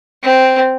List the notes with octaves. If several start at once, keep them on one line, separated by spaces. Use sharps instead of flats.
C4